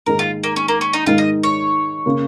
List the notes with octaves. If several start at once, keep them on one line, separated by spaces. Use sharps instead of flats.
G#2 D#3 A#3 D#4 G#4 A#4
F4
A#3
C#4
A#3
C#4
D#4
G#2 D#3 G#3 D#4 F4 A#4
D#5
C#5
C#3 A#3